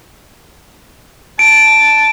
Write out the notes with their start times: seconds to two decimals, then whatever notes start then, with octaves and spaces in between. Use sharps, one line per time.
1.39 A5 D7